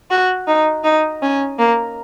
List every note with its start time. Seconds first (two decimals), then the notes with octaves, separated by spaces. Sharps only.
0.10 F#4
0.47 D#4
0.84 D#4
1.22 C#4
1.59 A#3